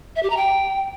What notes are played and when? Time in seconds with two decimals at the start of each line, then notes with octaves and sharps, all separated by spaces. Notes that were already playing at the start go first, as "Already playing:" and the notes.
0.16 E5
0.23 G4
0.30 A#5
0.37 G5